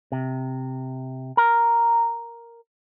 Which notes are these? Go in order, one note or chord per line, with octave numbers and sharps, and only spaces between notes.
C3
A#4